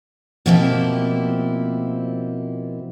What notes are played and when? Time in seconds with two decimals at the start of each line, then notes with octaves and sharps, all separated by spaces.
0.46 B2 F3 A#3 C4 E4 G4